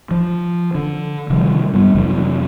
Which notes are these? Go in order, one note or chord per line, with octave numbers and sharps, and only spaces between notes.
F3
D3
C3 D#3 F3 G3
G2 G3 B3
F2 C3 E3 F#3